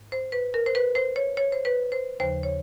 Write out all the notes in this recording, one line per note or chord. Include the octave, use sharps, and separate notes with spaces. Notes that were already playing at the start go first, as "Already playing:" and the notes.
Already playing: G#2
C5
B4
A#4
C5
B4
C5
C#5
C#5
C5
B4
C5
D#2 C#3 F3 C5
C#5